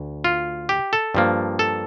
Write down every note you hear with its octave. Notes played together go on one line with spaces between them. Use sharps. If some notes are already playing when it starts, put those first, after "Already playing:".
Already playing: D2
F4
G4
A4
G2 F3 A#3
A4